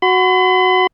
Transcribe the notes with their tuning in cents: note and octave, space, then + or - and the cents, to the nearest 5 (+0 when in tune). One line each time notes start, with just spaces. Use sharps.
F#4 +0 B5 +45